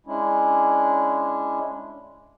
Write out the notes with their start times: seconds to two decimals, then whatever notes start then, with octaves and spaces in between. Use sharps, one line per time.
0.06 G#3 C#4 D4 E4